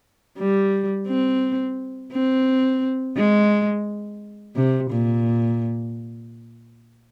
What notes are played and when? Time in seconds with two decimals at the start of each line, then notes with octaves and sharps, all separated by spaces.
0.38 G3
1.08 C4
2.12 C4
3.16 G#3
4.56 C3
4.91 A#2